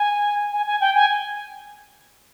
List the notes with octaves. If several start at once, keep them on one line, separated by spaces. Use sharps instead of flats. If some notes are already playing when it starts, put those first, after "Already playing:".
Already playing: G#5
G#5
G#5
G5
G#5